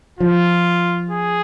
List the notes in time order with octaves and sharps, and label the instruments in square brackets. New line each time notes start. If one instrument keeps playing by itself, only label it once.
[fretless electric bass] F3 [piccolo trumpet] F4
[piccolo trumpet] G#4